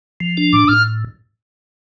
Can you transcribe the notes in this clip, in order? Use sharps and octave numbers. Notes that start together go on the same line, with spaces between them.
F3
D4
A2 D6
A2 F6